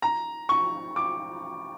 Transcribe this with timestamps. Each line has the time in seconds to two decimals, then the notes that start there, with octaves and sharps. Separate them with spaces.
0.02 A#5
0.49 C#6
0.96 D6